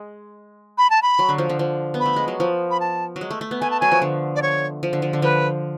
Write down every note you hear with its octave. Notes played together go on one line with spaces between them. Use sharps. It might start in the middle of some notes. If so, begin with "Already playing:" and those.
Already playing: G#3
B5
A5
B5
F#3
D3
F3
D3
F3
B3
B5
A3
G#3
F#3
F3
B5
A5
F#3
G#3
A3
A3
B3
A3 G#5
A5
F#3 G#5
F3
D3
D5
C#5
F3
D3
F3
D3
F3 B4